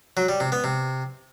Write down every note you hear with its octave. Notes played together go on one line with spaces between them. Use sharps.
F#3
G3
C3
B3
C3